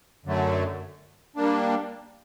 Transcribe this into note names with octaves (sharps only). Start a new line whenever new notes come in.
F#2 D3 F#3 A3
G3 A#3 D4